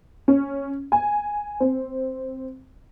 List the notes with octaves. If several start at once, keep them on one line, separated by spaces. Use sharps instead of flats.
C#4
G#5
C4